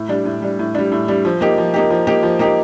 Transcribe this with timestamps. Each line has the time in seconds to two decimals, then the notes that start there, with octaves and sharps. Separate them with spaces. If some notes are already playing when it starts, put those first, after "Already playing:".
Already playing: A2
0.09 G3 D4
0.25 A2
0.42 G3 D4
0.59 A2
0.75 G3 D4
0.92 A2
1.08 G3 D4
1.25 F3
1.41 A#3 D#4 G4
1.58 F3
1.74 A#3 D#4 G4
1.90 F3
2.07 A#3 D#4 G4
2.23 F3
2.39 A#3 D#4 G4